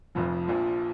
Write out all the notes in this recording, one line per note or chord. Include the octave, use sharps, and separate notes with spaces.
F1 F2 F3
A#1 A#2 F3